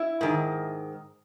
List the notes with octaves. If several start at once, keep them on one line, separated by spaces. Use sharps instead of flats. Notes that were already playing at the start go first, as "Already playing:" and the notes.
Already playing: E4
G#2 D#3